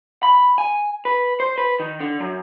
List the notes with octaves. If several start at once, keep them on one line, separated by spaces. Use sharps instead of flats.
B5
G#5
B4
C5
B4
D#3
D3
F#2